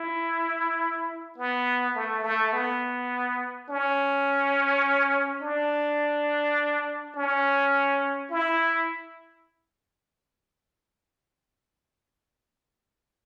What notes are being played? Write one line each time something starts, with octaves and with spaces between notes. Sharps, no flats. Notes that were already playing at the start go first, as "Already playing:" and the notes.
Already playing: E4
B3
A3
A3
B3
C#4
D4
C#4
E4